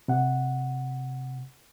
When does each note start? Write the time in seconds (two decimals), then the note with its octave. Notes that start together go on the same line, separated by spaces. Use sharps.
0.08 C3 F#5